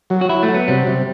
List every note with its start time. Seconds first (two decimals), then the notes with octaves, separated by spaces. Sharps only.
0.10 F#3
0.21 F#4
0.29 F#3 E4
0.43 A3
0.48 F#3
0.54 B3
0.68 C3 G3
0.87 C3